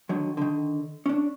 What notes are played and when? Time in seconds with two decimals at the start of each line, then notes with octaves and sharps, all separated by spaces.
0.09 D3 D#3 F#3
0.37 D3 D#3
1.06 C#4 D4